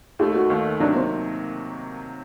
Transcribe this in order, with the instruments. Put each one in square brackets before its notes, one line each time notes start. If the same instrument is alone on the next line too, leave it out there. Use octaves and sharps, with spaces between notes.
[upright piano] D#2 D#3 A3 [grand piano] G4
[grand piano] F#4
[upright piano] D#2 D#3 A3
[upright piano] C3 D#3 F#3 A#3 [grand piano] D4
[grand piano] C4